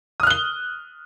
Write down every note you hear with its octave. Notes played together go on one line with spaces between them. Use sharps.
D#6 F6 F#6 G7